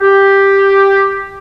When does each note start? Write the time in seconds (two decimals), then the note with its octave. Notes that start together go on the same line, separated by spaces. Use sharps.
0.01 G4